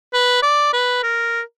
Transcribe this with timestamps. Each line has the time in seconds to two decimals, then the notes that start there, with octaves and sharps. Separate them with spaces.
0.13 B4
0.43 D5
0.73 B4
1.03 A#4